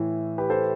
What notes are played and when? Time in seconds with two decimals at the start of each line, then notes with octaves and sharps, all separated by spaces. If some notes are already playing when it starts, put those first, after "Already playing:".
Already playing: A2 E3
0.38 G4 B4
0.50 A4 C5